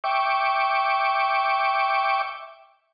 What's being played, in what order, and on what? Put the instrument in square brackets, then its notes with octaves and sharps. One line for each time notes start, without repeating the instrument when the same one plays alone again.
[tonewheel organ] E5 G5 C#6 D6